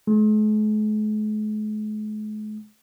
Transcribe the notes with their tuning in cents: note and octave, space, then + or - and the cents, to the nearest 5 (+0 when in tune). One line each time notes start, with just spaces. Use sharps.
G#3 +45